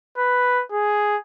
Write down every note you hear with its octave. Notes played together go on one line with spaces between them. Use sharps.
B4
G#4